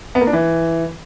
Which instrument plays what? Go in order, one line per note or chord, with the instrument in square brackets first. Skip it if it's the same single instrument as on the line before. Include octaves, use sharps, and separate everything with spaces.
[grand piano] B3
A#3
D4
E3